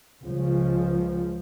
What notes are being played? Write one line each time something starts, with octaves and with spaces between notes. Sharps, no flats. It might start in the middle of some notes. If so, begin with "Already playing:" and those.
C#2 C#3 F3